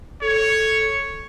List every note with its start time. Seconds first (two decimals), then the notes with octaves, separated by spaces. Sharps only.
0.22 A4 C#5